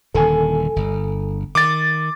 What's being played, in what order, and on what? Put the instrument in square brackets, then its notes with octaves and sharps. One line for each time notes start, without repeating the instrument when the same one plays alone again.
[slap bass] D#1 D3 D#3 [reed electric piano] A4 G#5
[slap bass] G1
[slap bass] D#3 [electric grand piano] D6 A6